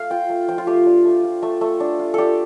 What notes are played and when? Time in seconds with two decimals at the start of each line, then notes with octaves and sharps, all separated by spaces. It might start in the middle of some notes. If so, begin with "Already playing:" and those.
Already playing: A3 F5
0.10 F4 G5
0.30 A3
0.48 F3 G5
0.58 F4
0.67 A3 G4
0.86 D4
1.05 A3
1.24 F4
1.43 A3
1.61 A3
1.80 D4
1.99 F4
2.14 D4 G4 A4